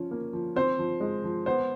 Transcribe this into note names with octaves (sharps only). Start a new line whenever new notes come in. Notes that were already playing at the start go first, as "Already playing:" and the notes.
Already playing: F3 C#4
A#3
F3
C4 C5
F3
G#3
F3
B3 C5